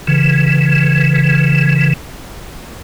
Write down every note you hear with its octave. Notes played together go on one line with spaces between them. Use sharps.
C#3 E3